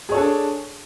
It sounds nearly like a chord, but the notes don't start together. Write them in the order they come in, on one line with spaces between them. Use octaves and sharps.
G#4 C#5 A4 D4